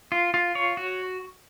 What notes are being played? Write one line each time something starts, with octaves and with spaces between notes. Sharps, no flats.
F4
F4
C#5
F#4